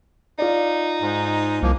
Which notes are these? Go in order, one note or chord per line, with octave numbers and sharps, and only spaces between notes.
D#4 F4 D5
G#2
C2 F3 A#3